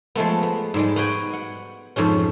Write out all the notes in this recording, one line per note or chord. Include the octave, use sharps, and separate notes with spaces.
F3 G#3 A3 B3
B3
G#2 G3 G#3
B3 F#4 B4 G5 G#5
F#5
F2 G#2 B2 C#4